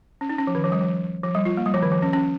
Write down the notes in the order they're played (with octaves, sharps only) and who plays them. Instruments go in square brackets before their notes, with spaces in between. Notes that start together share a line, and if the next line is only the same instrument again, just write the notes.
[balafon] C#4
D#4
C#4
F3
D#3
F3
G3
F3
F3
G3
F4
A#3
G3
F3
D#3
F3
C#4
C#4